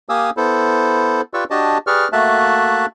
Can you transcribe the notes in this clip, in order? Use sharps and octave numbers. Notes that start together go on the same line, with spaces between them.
A#3 G4 F5 G#5 D#6 E6
B3 E4 A4 C5
F4 G4 B4 D5 C#6 E6
D4 F#4 G4 D#5 A5
G4 G#4 B4 D5 C#6 F6
A3 A#3 F#4 E5 A5 F#6